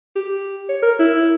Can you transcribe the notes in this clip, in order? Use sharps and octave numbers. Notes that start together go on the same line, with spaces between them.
G4
C#5
A#4
E4